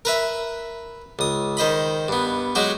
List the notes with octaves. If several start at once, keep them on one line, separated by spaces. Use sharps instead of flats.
A#4 B4 E5
C#2 D#6
D#3 C5 D#5 B5
G2 B3
F#3 G#3 F#4 G4